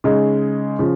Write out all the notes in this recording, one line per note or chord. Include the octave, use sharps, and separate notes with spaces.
C#3 G#3 D#4
C#3 F3